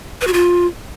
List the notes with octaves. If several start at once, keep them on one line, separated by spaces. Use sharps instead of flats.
B4
F#4
F4